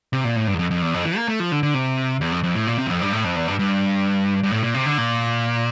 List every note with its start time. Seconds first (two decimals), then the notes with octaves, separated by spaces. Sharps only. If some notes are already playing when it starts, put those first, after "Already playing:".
0.13 C3
0.24 A#2
0.36 A2
0.48 G2
0.54 E2
0.59 F2
0.71 F2
0.82 E2
0.94 F2
1.05 E3
1.17 A#3
1.28 A3
1.40 F3
1.52 D3
1.63 D3
1.74 C3
2.21 E2
2.32 F2
2.43 F2
2.55 A2
2.67 A#2
2.78 C3
2.86 E2
2.90 F2
3.02 G2
3.13 A2
3.24 F2
3.36 E2
3.48 G2
3.59 G2
4.43 G2
4.51 A2
4.63 A#2
4.74 C3
4.86 D3
4.98 A#2